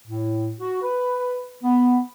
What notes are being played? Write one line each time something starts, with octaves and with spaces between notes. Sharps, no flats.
A2
F#4
B4
B3